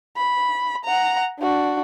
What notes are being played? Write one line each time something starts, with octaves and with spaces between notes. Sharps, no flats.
B5
F#5 A#5
D4 F#4